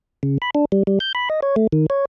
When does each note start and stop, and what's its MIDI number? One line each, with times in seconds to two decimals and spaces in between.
0.23 0.38 49
0.42 0.50 83
0.55 0.65 62
0.72 0.83 55
0.87 0.99 55
1.00 1.13 91
1.15 1.29 83
1.30 1.40 75
1.43 1.56 73
1.56 1.67 57
1.72 1.86 51
1.90 2.05 73